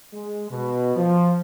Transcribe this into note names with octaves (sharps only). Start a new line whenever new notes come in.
G#3
B2
F3